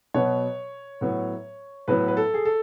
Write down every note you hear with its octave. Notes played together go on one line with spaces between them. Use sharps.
B2 F#3 B3 C#5
A2 F#3 B3
A2 F#3 B3 B4
B4
A4
G#4
A4